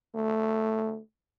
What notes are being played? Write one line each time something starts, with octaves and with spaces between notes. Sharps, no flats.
A3